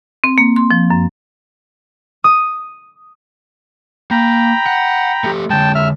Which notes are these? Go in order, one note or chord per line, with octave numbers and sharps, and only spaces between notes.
C4
A#3
C6
F3
F#2
D#6
A#3 G5 A#5 B5
F#5
A3 G4
D3 G#3 G5 A5
E5 F6